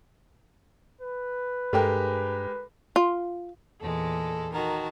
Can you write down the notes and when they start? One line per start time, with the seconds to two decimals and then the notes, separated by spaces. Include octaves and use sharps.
1.01 B4
1.73 G2 G#3 G4 A4 A#4 G5
2.96 F4
3.81 E2 A#2 G#3 A4
4.53 D#3 F#4 A#4 A5